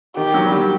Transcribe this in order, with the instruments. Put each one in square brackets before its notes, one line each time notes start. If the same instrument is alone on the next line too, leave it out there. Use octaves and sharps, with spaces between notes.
[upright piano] D#3 [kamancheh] G4
[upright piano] F#3
G3
F#3